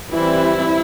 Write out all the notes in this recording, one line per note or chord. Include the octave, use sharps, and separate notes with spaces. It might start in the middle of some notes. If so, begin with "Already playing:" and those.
E3 G3 C4 E4